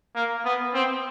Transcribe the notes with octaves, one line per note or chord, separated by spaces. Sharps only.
A#3
B3
C4